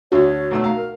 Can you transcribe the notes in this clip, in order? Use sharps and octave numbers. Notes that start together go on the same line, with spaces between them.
D2 D3 F#4 C#5
B1 A3 E6
A3 F5 A#5
A#4